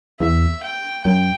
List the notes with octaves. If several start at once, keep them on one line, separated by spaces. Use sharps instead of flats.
E2 E5
G5
F#2 G5